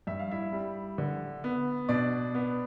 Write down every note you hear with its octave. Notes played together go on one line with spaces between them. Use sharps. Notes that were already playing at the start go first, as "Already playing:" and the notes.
G2 E5
F5
E4 E5
G3
D3
B3
B2 D4 D5
B3